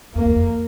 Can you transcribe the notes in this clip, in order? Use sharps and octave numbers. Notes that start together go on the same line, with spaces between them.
F2 A#3
E2
F2